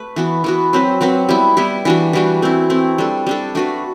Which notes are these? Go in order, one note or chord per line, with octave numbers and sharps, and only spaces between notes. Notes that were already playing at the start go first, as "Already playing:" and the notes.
Already playing: A3 B4
E3 B3 F#4
E3 B3 F#4
F#3 C4 F#4 B4
F#3 C4 F#4 B4
G3 B3 E4
G3 B3 E4
E3 G3 D4 F#4
E3 G3 D4 F#4
A3 C4 E4
A3 C4 E4
G3 D4 A4
G3 D4 A4
A3 D4 F#4 B4